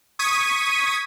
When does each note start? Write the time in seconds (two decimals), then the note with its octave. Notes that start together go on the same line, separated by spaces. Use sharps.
0.19 C#6 D#6 G#6 B6 D#7